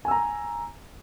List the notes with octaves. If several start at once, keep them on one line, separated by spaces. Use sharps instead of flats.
G#5 A#5 E6